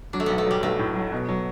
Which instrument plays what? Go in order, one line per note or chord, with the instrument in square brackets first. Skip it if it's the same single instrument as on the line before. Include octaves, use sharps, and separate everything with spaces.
[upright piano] F#3 [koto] D4
[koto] A3
[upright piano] B1 [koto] B3
[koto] A3
[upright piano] F#3 [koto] G3
[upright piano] B1 [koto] A3
[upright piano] A2
F#3
B2
F#3